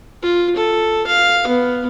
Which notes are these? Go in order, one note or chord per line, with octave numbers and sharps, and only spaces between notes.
F4
A4
F5
B3